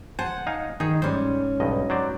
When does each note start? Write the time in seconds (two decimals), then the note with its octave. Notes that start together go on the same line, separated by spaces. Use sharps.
0.19 C5 F#5 G#5 A5
0.47 D#4 F5 G#5
0.80 D#3 D#4 G#4
1.02 G#2 G3 C#4 C5
1.60 B1 G2 D#5
1.90 F#3 C5 D5